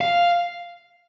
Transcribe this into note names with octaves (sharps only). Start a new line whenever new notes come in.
F5